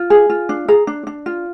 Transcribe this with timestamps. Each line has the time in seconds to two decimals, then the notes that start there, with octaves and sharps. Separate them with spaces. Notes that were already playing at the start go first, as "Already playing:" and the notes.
Already playing: F4
0.10 G#4
0.30 F4
0.49 D4
0.68 G#4 A#5
0.87 D4
1.07 D4
1.26 F4